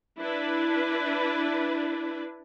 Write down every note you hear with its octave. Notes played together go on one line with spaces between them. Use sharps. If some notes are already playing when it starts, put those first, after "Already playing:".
D4 E4 B4